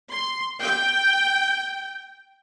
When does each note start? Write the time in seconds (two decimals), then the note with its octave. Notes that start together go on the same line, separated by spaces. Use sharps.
0.10 C6
0.62 G5